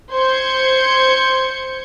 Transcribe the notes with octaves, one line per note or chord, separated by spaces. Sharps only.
C5 C6 G6 G#6 C#7